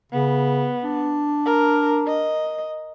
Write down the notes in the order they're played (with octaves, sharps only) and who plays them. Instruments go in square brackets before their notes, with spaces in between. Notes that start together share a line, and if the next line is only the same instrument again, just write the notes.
[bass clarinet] C#3 [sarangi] B3
[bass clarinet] D4
[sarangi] A#4
D#5